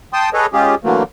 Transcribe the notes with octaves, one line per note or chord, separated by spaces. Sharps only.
G5 A5 C6 D#6
G#4 A4 B4 C#5 D#5
G#3 C#4 F4 G4 G#4
D3 E3 F#3 A3 A#3